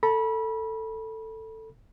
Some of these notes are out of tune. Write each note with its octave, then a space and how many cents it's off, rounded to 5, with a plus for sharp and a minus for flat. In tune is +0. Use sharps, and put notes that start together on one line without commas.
A4 +15 B5 -30